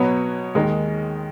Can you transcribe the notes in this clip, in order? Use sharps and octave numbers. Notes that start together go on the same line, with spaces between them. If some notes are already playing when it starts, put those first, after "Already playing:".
Already playing: B2 F#3 B3 F#4 C#5
D#2 D#3 G#3 D#4